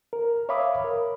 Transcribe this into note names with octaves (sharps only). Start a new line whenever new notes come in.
A#4
C#5 E5 F5 B5 D6 D#6
A#4